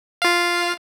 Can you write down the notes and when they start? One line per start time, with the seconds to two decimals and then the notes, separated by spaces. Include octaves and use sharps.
0.22 F4 F5